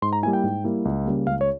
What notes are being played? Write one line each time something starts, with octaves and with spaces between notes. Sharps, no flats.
G#2 C6
A#5
G3 A#3 E4 G#5
G5
G#2
G3 A#3 E4
C#2
C#3 G3 A#3
C#2 F5
C#5